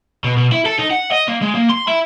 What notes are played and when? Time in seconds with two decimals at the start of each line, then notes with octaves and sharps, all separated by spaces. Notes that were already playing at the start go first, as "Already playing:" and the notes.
0.24 B2
0.37 B2
0.52 E4
0.66 A4
0.79 D#4
0.91 F#5
1.12 D#5
1.28 A#3
1.42 G#3
1.55 A#3
1.70 C6
1.88 E4